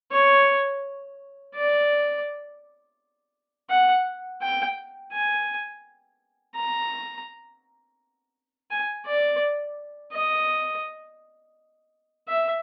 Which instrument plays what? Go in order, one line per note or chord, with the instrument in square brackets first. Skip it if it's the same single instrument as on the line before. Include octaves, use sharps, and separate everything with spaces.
[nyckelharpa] C#5
D5
F#5
G5
G#5
A#5
G#5
D5
D#5
E5